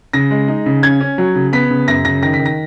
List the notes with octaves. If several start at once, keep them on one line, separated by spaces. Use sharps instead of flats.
C#3 A#6
G#3
D#4
C#3
C#4 G#6
C#4
F#3
C#3
B3 B6
C#3
F#2 A#6
C#3 A#6
D#3 A#6
B6
D#3
A#6